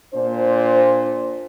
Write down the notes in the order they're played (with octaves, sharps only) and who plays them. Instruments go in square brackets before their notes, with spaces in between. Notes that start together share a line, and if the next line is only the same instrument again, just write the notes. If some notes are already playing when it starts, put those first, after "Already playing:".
[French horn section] A#2 D4 C5